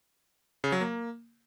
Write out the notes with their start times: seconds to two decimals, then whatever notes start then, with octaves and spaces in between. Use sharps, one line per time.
0.64 C#3
0.72 F#3
0.81 A#3